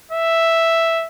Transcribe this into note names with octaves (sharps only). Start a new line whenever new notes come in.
E5